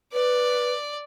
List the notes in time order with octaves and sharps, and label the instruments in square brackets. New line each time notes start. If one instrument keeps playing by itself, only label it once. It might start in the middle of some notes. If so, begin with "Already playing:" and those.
[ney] B4 [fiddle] D5